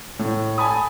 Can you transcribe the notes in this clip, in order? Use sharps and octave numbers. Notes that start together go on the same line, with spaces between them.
A2
G#5 A5 B5 D#6